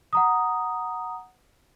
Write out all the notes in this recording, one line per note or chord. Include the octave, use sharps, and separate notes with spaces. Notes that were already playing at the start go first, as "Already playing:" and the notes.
F#5 A#5 D#6